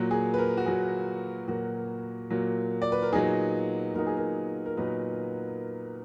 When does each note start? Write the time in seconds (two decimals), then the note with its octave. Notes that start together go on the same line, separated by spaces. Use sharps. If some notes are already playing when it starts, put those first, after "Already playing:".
Already playing: A#2 F#3 A#3
0.11 G#4
0.34 B4
0.38 A#4
0.57 F#4
0.66 A#2 F#3 A#3 G#4
1.47 A#2 F#3 A#3 F#4
2.30 A#2 F#3 A#3
2.82 D5
2.92 B4
3.02 A#4
3.13 A#2 F#3 B3 D#4 G#4
3.94 A#2 F#3 B3 D#4 A#4
4.07 G#4
4.17 A#4
4.66 A#4
4.77 A#2 F#3 B3 D#4 B4